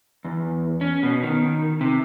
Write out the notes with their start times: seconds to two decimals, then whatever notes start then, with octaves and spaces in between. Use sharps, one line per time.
0.25 E2
0.81 C#4
1.03 B2
1.23 D#3
1.81 C3